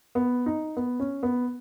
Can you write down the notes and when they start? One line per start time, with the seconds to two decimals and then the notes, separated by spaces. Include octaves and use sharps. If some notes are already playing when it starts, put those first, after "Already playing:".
0.15 B3
0.46 D#4
0.77 B3
1.00 C#4
1.23 B3